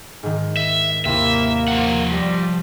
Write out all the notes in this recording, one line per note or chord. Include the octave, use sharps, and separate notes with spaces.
G#2 D#3
E5
D#2 C3 A#3 E4 E5
F3 F#5
G3 D5 A#6 B6